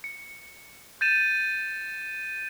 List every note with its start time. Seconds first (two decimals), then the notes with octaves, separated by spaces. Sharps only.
0.04 C#7
1.01 G6 A6 D#7 E7